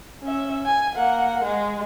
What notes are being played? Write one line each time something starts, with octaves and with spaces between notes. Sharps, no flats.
C#4 E5
G#5
A#3 F#5
G#3